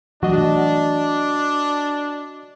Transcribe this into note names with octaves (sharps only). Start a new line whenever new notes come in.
E3 F#3 A3 D4 F#4 D#5